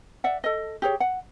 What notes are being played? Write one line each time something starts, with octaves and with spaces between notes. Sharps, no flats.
D5 E5 F#5
A4 D#5
G4 G#4 C#5
F#5